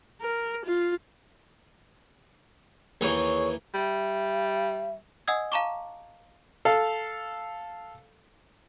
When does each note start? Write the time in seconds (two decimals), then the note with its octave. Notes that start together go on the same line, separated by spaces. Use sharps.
0.21 A#4
0.65 F4
3.01 D#2 E3 G#4 C#5
3.74 G3 E5
5.28 D#5 F#5 G#5 D#6 E6 G#6
5.52 F5 A5 A#5 C#6 D6
6.65 A4 F5